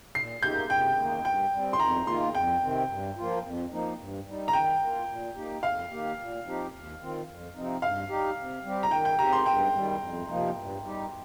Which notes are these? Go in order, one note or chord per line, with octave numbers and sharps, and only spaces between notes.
A#2 C7
A#3 D#4 G4 G6
C3 G5
D#3 A#3 D#4
G2 G5
G3 C4
C6
F2 A#5
D#3 A#3 F4 C6
F2 G5
C3 D#3 C4
G2
F3 A#3 F4
F2
F3 A#3 D#4
G2
G3 D#4
A#5
D#3 G5
A#3 F4
A#2
A#3 D#4 G4
F2 F5
D#3 A#3 G4
A#2
F3 C4 D#4 G4
D#2
D#3 C4 F4
F2
C3 F3 C4 D#4
G2 F5
G3 D#4 G4
C3
G3 C4 G4
A#5
D#3 G5
G5
C4 G4 A#5
C6
G2 G5
D#3 G3
F2
C3 F3 A#3 D#4
G2
G3 D#4 G4